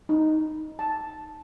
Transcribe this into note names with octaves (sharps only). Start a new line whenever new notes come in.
D#4
A5